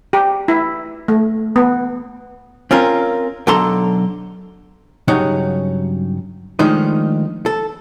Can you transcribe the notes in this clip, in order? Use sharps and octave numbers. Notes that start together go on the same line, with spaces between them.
G4
E4
A3
B3
C4 C#4 F4 A#4
B1 D3 F#3 A4 A#5 C6
G2 C#3 F#3 D#4 C#5 F#5
D#3 F3 G#3 A3 D4 D#4
A4